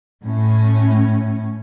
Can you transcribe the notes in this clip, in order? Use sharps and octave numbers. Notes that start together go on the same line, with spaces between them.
A2 C#4